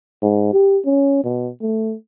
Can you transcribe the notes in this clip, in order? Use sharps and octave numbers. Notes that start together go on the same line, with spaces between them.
G#2
G4
C#4
B2
A3